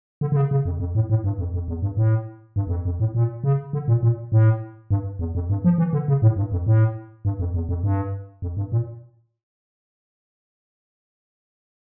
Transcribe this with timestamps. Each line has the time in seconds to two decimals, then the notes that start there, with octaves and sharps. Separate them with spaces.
0.21 D3
0.32 D3
0.36 C#3
0.51 C#3
0.65 F2
0.80 F2
0.95 A2
1.10 A2
1.24 G2
1.39 F2
1.54 F2
1.68 E2
1.82 G2
1.97 A2
2.56 G2
2.67 E2
2.70 F2
2.85 F2
3.00 A2
3.15 A#2
3.44 C#3
3.73 D3
3.88 A#2
4.03 A#2
4.32 A2
4.91 G2
5.19 E2
5.35 F2
5.50 G2
5.64 F3
5.78 E3
5.93 D3
6.08 C#3
6.22 A2
6.37 G2
6.52 F2
6.67 A2
7.25 G2
7.40 F2
7.54 E2
7.69 F2
7.84 G2
8.42 F2
8.57 G2
8.72 A#2